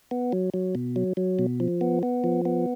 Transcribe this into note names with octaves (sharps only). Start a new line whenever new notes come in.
B3
F#3
F#3
B2
F#3
F#3
B2
F3
B3
B3
F3
B3